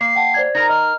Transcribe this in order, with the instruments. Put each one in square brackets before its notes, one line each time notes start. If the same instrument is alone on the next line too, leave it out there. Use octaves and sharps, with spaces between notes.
[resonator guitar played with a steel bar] A#3 [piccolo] C7
[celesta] F#5 G5 A5
C5 D5 G#6
[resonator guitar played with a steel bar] D#4 A#4 A#5 [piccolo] A#6
[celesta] D#5 [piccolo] F6